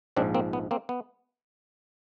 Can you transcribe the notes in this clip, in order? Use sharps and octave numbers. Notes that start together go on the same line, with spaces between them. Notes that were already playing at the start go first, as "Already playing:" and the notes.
A#1 G#2 F3 C4 D4
A#3 C4
B3
A#3 C4
B3